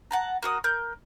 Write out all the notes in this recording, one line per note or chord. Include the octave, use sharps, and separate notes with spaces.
F#5 A5 A#5
A#3 F#4 D#6
A#4 G6